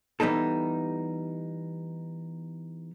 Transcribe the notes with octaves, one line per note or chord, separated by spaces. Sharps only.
E3 G3 B3 D#4 A4